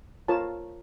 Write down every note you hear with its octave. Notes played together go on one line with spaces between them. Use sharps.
F4 A#4 C#5 A5